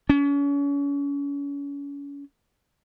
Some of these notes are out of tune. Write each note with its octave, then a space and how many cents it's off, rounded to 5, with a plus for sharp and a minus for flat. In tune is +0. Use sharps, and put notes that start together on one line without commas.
C#4 +35